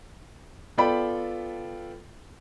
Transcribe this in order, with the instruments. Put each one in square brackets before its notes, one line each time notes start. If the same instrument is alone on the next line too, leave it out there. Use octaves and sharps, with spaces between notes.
[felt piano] B3 F4 A4 D5 G5 B5